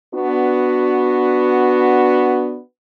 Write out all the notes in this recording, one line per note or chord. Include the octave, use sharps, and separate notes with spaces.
B3 D4 F#4